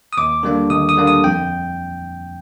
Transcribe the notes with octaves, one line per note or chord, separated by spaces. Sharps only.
D#6
D#2 D6
D3 G3 A#3 D4
D#2 D#6
D#6
D3 G3 A#3 D4
D#6
F2 G5